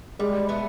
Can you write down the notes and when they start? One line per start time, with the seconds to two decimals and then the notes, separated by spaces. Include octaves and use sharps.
0.19 G3 G#3
0.49 A3 B3